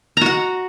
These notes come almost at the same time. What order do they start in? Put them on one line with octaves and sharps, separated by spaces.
A#5 F#4 F#5